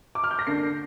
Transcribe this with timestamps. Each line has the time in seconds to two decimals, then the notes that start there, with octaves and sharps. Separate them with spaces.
0.15 D6
0.24 F6
0.31 G6
0.39 A#6
0.47 D3 A#3 D4 C7